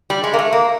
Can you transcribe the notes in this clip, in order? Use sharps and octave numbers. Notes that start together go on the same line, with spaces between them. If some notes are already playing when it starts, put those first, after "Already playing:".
G3
G#3
A#3
A3
A#3